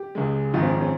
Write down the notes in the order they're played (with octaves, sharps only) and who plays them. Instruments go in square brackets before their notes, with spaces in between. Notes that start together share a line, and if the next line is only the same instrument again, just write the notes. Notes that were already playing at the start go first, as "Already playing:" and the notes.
Already playing: [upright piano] G4
[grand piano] C#2 C#3 G#3
[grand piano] A#1 G#2 D#3 G#3 [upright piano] F4
[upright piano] C4
C#4
C4